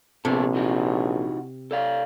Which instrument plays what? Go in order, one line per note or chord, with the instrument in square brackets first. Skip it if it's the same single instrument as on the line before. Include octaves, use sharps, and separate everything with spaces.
[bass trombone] A#1 [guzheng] C3 [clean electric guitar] B3 G#4 A4
[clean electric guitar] E3 D#4 F#4
A4 D5 F5